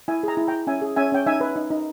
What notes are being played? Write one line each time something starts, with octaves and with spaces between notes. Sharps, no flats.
E4 E5 G#5
G#4 G5 A#5
E4
E4 G5 A#5
C#4 E5 G#5
G#4
C#4 E5 G#5
C#4 G5
D#4 E5 G#5
B4
D#4
D#4